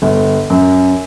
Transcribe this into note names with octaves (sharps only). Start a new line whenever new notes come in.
G1
F#2